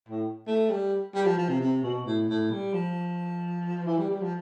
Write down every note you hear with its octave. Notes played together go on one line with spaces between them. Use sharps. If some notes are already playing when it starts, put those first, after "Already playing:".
A2
A3
G3
G3
F3
F3
C3
C3
B2
A2
A2
G3
F3
E3
G3
G3
F3